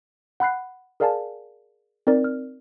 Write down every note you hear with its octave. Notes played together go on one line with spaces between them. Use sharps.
F#5 B5 F#6 C7
G#4 A#4 D5 F5 G#5 A5
C4 D#4 A#4 D5
F6